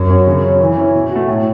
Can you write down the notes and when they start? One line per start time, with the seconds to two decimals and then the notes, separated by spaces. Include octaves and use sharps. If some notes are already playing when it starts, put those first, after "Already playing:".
Already playing: F#2
0.09 C#4 F#4
0.27 C#3
0.44 F#3 C#4
0.61 E3
0.77 C#4 E4
0.95 B2
1.11 A3 F#4
1.28 A2